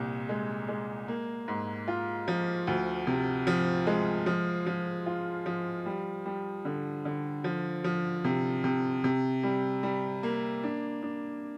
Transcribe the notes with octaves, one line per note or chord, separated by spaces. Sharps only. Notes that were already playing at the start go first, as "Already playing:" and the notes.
Already playing: C2 A#2
G#3
G#3
A#3
G#2
F4
F3
D2
C3
F3
G#3
F3
F3
F4
F3
G3
G3
D3
D3
F3
F3
C3
C3
C3
G3
G3
A#3
D4
D4